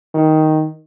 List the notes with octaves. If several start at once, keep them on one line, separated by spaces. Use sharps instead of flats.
D#3